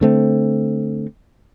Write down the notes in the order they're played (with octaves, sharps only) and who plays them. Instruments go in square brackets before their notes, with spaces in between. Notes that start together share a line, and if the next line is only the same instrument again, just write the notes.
[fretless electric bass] D3 A3 C4